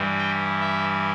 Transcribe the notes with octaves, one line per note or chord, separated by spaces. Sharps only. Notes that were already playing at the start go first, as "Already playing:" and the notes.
Already playing: G2 E3 G3
G5
E5